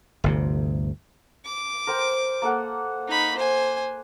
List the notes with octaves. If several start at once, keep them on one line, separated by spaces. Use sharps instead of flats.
G1 D2 C3
D6
A#4 C5 G5
A#3 A4 F#5
D#4 B5
C5 G#5